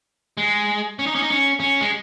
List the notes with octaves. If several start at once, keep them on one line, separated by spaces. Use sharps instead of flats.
G#3
C#4
D#4
C#4
D#4
C#4
C#4
G#3